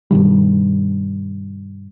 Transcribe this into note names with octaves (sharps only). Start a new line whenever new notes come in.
G2 B2 D#3 G3